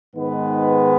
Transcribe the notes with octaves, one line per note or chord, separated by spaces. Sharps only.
G#2 D#3 G#3 B3 B4